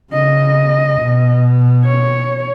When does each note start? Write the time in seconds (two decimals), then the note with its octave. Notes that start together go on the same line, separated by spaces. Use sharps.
0.12 C#3 D#5
1.00 B2
1.85 C#5